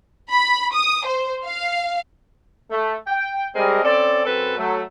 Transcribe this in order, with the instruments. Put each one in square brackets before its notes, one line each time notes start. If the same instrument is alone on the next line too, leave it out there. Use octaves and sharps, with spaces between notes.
[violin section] B5
D#6
C5
F5
[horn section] A3
G5
G3 G#3 C4 G#4 A#4 D#5
C4 C#4 A4 D5
F#2 C4 A4 B4
F#3 A3